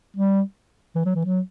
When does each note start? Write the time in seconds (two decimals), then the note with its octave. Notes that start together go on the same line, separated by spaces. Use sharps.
0.17 G3
0.96 E3
1.05 F#3
1.16 E3
1.25 F#3